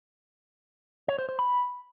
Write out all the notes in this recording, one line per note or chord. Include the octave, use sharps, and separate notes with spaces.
C#5
C5
C5
B5